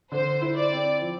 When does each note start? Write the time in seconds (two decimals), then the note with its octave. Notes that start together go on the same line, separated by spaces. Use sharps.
0.12 D3 C5
0.41 E4
0.57 D5
0.72 C4
1.01 F3